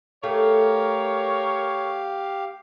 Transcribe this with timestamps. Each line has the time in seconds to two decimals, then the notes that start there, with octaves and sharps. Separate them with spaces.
0.24 A3 G4 A#4 C#5 F5